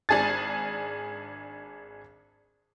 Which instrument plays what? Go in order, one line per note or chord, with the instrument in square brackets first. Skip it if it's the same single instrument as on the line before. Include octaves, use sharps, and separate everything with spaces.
[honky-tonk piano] G#1 D4 G#4 G#5 A6